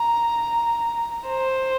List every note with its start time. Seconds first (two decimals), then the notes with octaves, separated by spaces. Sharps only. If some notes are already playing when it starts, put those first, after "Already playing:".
Already playing: A#5
1.27 C5